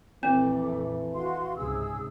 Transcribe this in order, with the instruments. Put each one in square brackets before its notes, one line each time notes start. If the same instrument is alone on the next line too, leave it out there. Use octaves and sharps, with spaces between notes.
[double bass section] A#1 F2 A3 [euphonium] E3 [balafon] C4 [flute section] D6
[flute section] F#4 F5 C6
[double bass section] C#2 G#2 C3 [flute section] G#4 E6